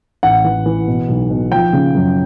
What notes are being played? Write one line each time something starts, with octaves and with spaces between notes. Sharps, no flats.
A1 F#5
E3
E3
B2
B1
B2
F3 G5
C#3
F#2